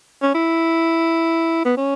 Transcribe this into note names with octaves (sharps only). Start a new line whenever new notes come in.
C#4
E4
B3
C#4